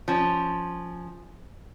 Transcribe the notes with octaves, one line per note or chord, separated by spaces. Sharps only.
F3 C#4